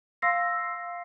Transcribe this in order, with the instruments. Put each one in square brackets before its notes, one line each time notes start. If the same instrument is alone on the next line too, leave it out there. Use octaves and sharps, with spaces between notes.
[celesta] F5 C6 E6 A#6 C7